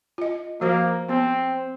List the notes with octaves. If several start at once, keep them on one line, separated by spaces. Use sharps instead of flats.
F4 D#5
F3 A#3 F#4 C5
B3 C4